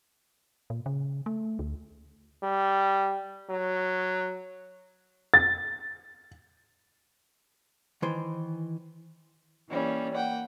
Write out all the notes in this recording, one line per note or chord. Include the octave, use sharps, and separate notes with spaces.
A#2
C#3
A3
D2
G3
F#3
A6
D#3 E3 C5
E3 G3 A#3 C#4
A#3 F#5 G5